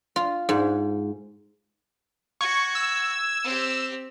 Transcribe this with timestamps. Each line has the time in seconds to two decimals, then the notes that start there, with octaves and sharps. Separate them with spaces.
0.16 F4
0.49 G#2
2.41 F#4 C#6 G#6
2.75 E6
3.44 C4 G4